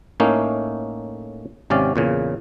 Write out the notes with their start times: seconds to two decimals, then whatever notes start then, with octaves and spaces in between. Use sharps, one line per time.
0.20 A2 A3 A#3 C#4 D#4
1.70 G#1 C3 C#4 D5 F5
1.96 E2 A#2 C#3